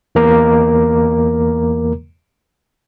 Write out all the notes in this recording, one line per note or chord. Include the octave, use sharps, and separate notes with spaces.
E2 E3 A#3 A#4 A#5 D6